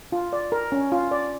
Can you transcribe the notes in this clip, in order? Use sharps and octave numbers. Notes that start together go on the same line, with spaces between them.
F4
D5
A#4
C#4
F4
D5